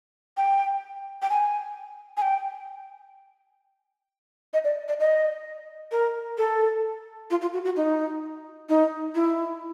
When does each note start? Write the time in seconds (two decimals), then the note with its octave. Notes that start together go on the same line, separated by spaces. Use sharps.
0.37 G5
1.22 G5
1.30 G#5
2.17 G#5
2.22 G5
4.53 D#5
4.64 D5
4.88 D5
5.00 D#5
5.92 A#4
6.38 A4
7.30 F4
7.41 F4
7.53 F#4
7.65 F#4
7.76 D#4
8.69 D#4
9.15 E4